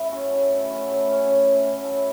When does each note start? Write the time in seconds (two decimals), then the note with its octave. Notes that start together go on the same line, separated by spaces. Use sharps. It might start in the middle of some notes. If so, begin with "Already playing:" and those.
Already playing: C#3 A3 E4 A4
0.11 F#2 C#4 F#4
0.30 E4 A4
0.49 A3 E4 A4
0.69 C#4 F#4
0.88 A2 E4 A4
1.07 C#4 F#4
1.27 A2 C#4
1.46 E4
1.65 A2 C#4 F#4
1.84 E4 A4